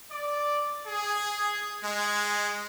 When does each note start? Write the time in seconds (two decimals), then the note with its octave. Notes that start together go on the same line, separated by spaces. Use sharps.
0.10 D5
0.86 G#4
1.83 G#3